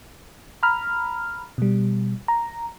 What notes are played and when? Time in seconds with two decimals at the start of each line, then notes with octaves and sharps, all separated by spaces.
0.63 A#5 B5 F6
1.58 B2 G3
2.28 A#5